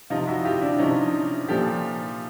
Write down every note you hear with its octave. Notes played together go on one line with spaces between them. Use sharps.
C3 F3 D#4 F4
E4 F#4
F4 G4
D4 E4
C3 F3 C#4 D#4
A#2 F3 G4 A4